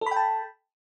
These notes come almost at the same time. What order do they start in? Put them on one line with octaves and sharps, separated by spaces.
A4 B5 G5 A5